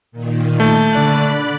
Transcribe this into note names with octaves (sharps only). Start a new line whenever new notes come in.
A#2 D#3
A3 A5 G6
D3 D5 B5 F#6